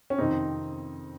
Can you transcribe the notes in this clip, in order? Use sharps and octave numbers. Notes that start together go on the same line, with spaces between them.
C#4
F2 C3 D#3 C4 D#4